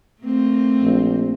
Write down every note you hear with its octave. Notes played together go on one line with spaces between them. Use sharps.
A3 A#3 C4
A#1